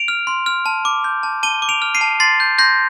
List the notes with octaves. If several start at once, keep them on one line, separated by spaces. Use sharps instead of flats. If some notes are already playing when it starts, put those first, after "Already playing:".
Already playing: D7 F7
F6
C6
F6
A5
D6
G6
A5
A5 D#7 G7
D6
D7 F7
F6
C7 D#7
A5
C6 A6 C7
G6
C6 G6 A#6